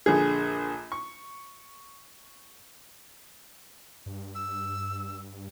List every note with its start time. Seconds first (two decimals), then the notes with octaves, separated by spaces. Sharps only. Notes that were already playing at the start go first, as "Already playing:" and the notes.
0.06 A#1 D3 G#4
0.92 C#6
4.06 G2
4.35 E6